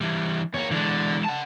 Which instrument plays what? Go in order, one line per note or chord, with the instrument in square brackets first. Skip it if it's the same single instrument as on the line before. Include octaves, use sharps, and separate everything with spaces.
[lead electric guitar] E3 G3
[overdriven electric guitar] E2 A#3 [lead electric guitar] C#5
[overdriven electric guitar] D3 [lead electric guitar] E3 G#3
[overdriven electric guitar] F#5 A5